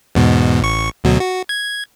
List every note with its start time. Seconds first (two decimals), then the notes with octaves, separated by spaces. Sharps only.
0.15 E2 G#2 B2
0.62 A1 C#6
1.04 D2 B2 F#3
1.20 F#4
1.49 G#6